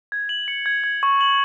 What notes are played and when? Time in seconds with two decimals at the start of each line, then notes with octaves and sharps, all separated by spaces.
0.12 G#6
0.29 F#7
0.48 C#7
0.66 G#6
0.84 G#6
1.03 C#6
1.21 F#7